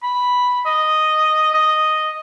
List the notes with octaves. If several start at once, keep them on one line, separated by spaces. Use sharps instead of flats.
B5
D#5
D#5